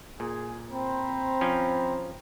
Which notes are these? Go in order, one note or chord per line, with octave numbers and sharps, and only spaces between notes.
A#2 G#4
C4 C5 A#5 B5
F3 C#4